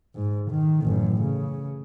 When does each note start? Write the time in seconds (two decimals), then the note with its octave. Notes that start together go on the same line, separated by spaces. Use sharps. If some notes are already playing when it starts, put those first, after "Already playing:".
0.14 G#2
0.50 D#3
0.82 A1 F#2
1.21 C#3